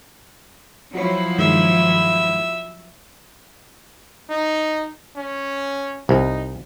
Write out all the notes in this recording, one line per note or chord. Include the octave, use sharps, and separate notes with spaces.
F3 F#3 E4 F#4 C#5
G2 D#3 G#3 E5
D#4
C#4
C2 D#4